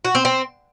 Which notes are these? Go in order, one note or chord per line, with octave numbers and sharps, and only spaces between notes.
F#4
C4
C4